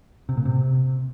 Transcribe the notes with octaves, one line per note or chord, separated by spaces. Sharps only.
C3
A#2
C3